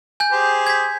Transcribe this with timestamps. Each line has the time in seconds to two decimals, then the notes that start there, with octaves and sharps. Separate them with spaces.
0.20 G#5 G6
0.32 G4 G#4 C5
0.67 G#6 B6